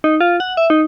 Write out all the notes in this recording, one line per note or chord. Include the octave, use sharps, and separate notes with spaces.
D#4
F4
F#5
E5
D#4